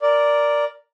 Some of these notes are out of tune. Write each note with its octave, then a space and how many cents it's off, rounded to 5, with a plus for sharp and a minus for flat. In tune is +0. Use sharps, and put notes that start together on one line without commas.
A#4 +0 D5 +0